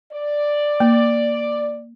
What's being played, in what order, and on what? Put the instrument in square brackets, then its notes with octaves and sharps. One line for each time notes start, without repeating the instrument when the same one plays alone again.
[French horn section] D5
[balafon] A#3